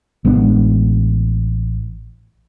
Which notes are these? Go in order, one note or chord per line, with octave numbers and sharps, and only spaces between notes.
A1 G#3 B3 D4